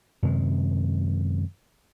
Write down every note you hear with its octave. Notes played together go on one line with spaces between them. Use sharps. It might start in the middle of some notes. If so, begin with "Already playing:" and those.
F#2 C3 D#3 G#3